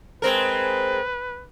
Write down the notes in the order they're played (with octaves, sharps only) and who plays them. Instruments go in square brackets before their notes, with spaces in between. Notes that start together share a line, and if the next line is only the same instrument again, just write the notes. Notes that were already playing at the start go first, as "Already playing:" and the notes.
[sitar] G#3 C4 A#4 [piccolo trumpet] B4